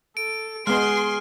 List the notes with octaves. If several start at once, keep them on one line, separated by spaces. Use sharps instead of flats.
A4 D7
G#3 B3 G#4 C6 F6